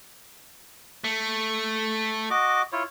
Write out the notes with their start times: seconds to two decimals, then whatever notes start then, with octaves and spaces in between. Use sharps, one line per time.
1.04 A3
2.30 F#4 D#5 D6
2.72 E4 F4 C#5